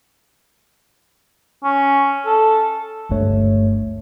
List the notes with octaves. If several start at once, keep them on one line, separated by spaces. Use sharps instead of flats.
C#4
A4
G1 C#2 G2 A3 C#5